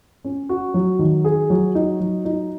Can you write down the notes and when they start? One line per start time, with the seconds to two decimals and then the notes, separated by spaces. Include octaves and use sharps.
0.24 C#4
0.49 F#4
0.74 F#3
0.99 D#3
1.25 G#4
1.50 F#3
1.75 D#4
2.00 F#3
2.25 D#4